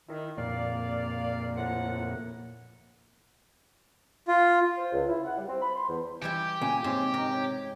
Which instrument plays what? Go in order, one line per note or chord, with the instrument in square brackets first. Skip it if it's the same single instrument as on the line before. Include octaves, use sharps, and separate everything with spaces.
[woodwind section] D#3 [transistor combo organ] E4
[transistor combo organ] F2 A#2 A#3 [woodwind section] D5 F5
[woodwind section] A2 F3 F#5
[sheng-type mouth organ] F4
[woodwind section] C5
C#2
E4
F#5
G3
C4
B5
C6
E2
[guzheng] E3 G3 E4 [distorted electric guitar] G4 [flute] G6
[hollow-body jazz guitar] A#2 C#3 [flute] G#5
[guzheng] G#2 [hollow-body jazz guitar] C3 [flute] C#5
[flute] D#4 [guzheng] A#4
[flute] C#5